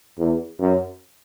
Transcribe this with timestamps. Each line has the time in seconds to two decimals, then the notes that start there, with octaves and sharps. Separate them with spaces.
0.18 E2
0.59 F#2